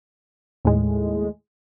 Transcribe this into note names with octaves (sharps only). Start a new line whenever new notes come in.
D#2 A2 G#3